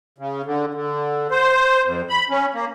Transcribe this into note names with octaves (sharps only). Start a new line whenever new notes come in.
C#3
D3
D3
C5
F2
B5
C#4
A#3